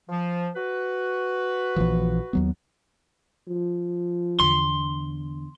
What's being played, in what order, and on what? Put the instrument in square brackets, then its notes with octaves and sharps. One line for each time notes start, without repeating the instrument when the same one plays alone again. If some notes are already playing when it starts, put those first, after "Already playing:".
[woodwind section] F3
F#4 B4
[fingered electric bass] A#1 E3 F3
D#2 F#3 B3
[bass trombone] F3
[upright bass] E2 D3 [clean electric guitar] C6